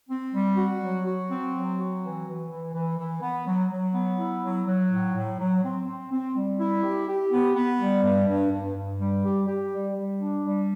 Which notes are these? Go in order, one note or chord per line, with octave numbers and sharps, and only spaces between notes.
C4
G3
F#4
F#3
F#4
C4
F#3
F#4
E3
E3
E3
E3
E3
B3
F#3
F#3
B3
E4
F#3
F#3
A2
A2
F#3
C4
C4
C4
G3
E4
G4
G4
B3
B3
G3
G2
G2
G2
G2
G3
G4
G4
G3
G3
D4
G3